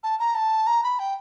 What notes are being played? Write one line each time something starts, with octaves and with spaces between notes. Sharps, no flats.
A5
A#5
A5
A#5
B5
G5